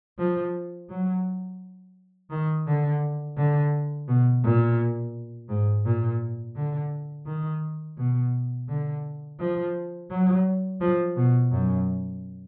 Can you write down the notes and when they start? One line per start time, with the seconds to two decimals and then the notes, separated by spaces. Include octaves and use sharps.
0.18 F3
0.89 F#3
2.31 D#3
2.66 D3
3.37 D3
4.08 B2
4.43 A#2
5.49 G#2
5.85 A#2
6.55 D3
7.26 D#3
7.98 B2
8.69 D3
9.39 F3
10.10 F#3
10.81 F3
11.16 B2
11.51 F#2